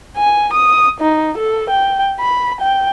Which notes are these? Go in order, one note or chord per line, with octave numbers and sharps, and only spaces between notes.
G#5
D#6
D#4
A4
G5
B5
G5